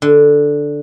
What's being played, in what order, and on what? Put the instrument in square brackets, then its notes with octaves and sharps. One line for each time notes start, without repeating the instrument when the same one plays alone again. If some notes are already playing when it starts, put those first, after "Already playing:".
[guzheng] D3